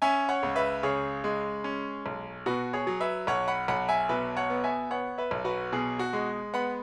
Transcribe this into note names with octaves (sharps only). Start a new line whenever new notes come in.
C#4 E5 G#5
C#5 F#5
C#2
B4 E5
C#3 G#4 C#5
G#3
C#4
B1
B2 F#4 B4
G#4 C#5
F#3
B4 E5
B1 C#5 F#5
F#5 B5
B1 F#5 B5
E5 G#5
B2 B4 E5
C#5 F#5
B3
E5 G#5
B3 C#5 F#5
B4 E5
B1
F#4 B4
B2 G#4
F#4
G#3
B3 F#5 B5